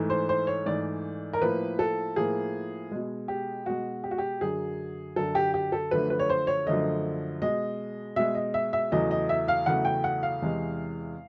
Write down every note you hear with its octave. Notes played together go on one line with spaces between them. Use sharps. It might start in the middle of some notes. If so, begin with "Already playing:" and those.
Already playing: G#2 E3 A3
C5
C5
C#5
G#2 E3 A3 D5
A#4
A2 F3 A#3 B4
A4
A2 F3 A#3 G#4
B2 G#3
G4
B2 G#3 F#4
G4
F#4
G4
F#2 D3 F#3 G#4
F#2 D3 F#3 A4
G4
G4
A4
F#2 D3 F3 A3 B4
B4
C#5
C5
C#5
F#2 D3 F3 A3 D#5
B2 G#3 D#5
B2 G#3 E5
D#5
E5
E5
E2 C#3 F#3 A3 D#5
D#5
E5
F5
E2 C#3 F#3 A3 F#5
G5
F#5
F5
E2 C3 E3 G#3